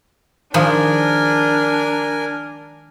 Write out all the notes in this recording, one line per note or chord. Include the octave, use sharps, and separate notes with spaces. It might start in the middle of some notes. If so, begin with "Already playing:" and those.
D#3 F3 G#3 D4 A#4 G#5